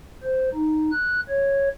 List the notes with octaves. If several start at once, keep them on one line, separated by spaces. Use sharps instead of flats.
C5
D#4
F#6
C#5